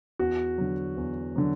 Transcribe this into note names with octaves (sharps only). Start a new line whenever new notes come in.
E2 F#4
D3 F#3
E2
D3 F#3